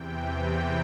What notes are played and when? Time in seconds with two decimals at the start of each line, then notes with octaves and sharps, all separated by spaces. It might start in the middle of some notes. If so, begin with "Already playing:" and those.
Already playing: E2 C3 E3 G5
0.20 G5